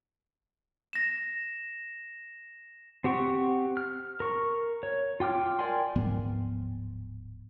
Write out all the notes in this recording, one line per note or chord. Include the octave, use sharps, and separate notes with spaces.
A#6 E7
C4 G4 F#5 C#6
F6
A#4 C#6
C#5
F4 G5 D6 F6
A#4 D5 G5 G#5 C6
D1 G#2 F3 B3